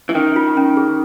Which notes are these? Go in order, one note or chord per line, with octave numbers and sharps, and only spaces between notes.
E3
D#3 C#4
F4
C#4
G#4